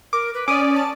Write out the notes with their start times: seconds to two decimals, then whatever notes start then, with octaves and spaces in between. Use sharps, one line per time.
0.13 A#4 D6
0.34 B4
0.48 C#4 D5 G#5 D6 D#6
0.76 A5